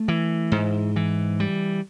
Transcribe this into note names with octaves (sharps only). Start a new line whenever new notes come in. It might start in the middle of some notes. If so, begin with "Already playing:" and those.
Already playing: A3
E3
G#2
E3
G3